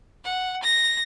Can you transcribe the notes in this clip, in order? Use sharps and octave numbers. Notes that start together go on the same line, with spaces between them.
F#5
A#6